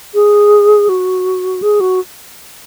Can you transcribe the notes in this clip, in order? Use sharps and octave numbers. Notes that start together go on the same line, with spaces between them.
G#4
F#4
G#4
F#4